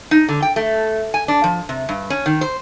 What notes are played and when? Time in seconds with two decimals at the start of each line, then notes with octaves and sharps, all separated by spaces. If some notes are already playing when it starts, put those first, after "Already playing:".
0.11 D#4
0.29 D3
0.42 G5
0.56 A3
1.14 G#5
1.28 D4
1.44 F3
1.69 C3
1.89 G2
2.10 C#4
2.26 D#3
2.41 C5